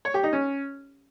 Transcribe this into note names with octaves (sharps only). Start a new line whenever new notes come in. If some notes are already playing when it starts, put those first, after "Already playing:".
C#5
G4
D#4
C#4